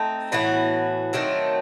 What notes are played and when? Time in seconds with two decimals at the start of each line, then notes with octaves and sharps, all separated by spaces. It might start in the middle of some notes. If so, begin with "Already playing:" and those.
Already playing: A3 C4 D#4
0.32 A2 E3 B3 F#4
1.13 D#3 F#3 A3 C4